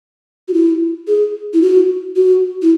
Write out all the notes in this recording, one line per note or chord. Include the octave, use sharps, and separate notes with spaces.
F#4
E4
G#4
E4
F#4
F#4
E4